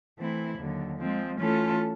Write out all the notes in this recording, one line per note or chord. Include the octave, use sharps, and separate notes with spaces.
E3 A3 C4 E4
D#2 D3 F#3
F3 G#3 C4
E3 A3 C#4 F4 A4